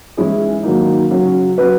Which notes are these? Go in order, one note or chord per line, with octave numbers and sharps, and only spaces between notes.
E3 G#3 C#4 E4 G#4
G#2 D#3 F#3 A#3 D#4
C#3 F#3 C#4
F#3 C#4 F#4 B4